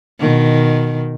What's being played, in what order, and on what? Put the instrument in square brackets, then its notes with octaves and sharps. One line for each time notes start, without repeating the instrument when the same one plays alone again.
[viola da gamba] B2 D#3